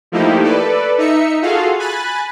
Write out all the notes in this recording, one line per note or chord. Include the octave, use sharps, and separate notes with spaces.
F3 A3 A#3 D#4 E4 G4
A4 B4 D5
D#4 E5 C#7
F4 F#4 G#4 A4 F5
G#5 B5 F#6 A6